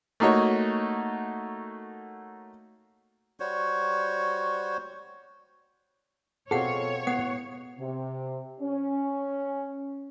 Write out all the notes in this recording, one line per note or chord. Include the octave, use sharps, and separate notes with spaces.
A3 A#3 D#4 F#4 C#5
G3 F#4 C5 C#5
B2 C4 F4 G#4 A4 C#5 F#5
A2 B3 F#5
C3
C#4